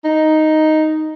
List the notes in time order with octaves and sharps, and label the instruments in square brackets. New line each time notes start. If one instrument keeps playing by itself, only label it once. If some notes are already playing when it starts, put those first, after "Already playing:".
[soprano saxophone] D#4